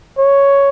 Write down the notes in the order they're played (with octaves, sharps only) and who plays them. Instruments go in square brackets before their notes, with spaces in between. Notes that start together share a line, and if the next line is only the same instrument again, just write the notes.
[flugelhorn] C#5